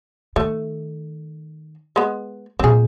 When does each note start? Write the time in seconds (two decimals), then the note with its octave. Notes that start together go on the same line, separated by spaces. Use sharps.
0.36 D#3 A3
1.96 G#3 B3
2.59 A#2 A3 C4 G#4